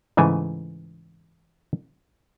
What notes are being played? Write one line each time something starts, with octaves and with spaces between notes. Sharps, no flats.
G#2 C#3 E3 A3 G#5